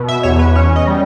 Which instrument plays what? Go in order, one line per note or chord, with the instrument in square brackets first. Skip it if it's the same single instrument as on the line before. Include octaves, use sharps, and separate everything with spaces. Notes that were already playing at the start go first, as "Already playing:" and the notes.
Already playing: [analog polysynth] B2
E5
E2 C#5
B4
C#4 C#5
D#5
G3